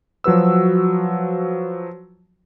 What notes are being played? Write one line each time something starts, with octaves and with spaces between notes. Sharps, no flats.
F3 F#3 F#4 B4 E6